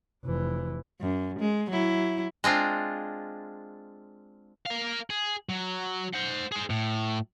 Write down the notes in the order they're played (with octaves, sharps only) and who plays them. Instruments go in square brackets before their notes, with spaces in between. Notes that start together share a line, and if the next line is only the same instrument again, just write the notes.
[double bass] F1 E3
[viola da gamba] F#2
G#3
F#3 E4
[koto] G#3 C4 D4 F4
[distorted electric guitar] A#4 F5
G#4
F#3
C5 F#5
G#4 C5
A2